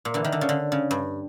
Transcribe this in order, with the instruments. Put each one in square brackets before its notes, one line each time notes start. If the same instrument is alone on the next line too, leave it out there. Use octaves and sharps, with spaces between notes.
[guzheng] A#2
D3 E3
D#3
D3
C#3
D3
C#3
G2